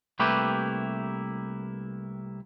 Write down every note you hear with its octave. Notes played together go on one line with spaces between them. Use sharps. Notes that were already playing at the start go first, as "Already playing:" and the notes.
C2 A3 A#3 E4 G4 B4